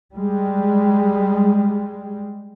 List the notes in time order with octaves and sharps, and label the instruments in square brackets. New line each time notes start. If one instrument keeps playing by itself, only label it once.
[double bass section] G3 G#3